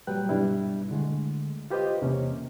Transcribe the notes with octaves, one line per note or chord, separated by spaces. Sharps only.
A#2 F#3 G3 B4 G5 F#6
G2 B2 G3 D4 E4
D3 G#3 A3
F4 G4 B4 C5 D#5
E2 C3 A#3 C#4